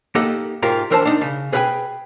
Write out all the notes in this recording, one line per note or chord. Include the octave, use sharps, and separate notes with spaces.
A#3 D#4 G4 A4 D#5 F#5
G#2 F4 G4 A#4 A#5
D3 E3 A#4 C5 D#5 A5
D4 D#4
C#3
G#4 B4 D5 F5 G5 G#5